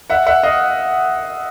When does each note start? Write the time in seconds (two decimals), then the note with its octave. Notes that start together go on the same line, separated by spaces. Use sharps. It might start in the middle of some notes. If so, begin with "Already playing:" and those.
0.10 E5 F#5
0.26 E5 F#5
0.43 D#5 F5